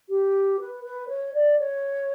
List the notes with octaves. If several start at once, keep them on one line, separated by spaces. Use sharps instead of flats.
G4
B4
B4
C#5
D5
C#5